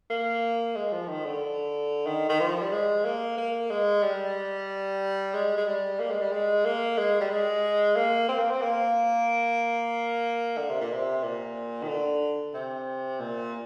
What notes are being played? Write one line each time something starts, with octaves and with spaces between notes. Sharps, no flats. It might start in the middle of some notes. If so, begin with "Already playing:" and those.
A#3
G#3
F3
D#3
D3
D#3
D#3
F3
G3
G#3
A#3
A#3
G#3
G3
G#3
G#3
G3
A#3
G#3
G3
G#3
A#3
G#3
G3
G#3
A#3
C4
A#3
C4
A#3
D3
C3
A#2
C3
A#2
D#3
D3
C3
A#2